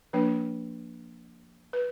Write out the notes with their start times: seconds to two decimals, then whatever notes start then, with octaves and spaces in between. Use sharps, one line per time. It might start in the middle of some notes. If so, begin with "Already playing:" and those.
0.13 F3 A#3 D4 B4
1.73 B4